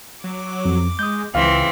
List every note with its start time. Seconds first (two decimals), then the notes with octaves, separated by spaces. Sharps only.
0.24 F#3 D6
0.65 F2
0.99 G#3 D#6 G6
1.35 C#2 E3 C4 F5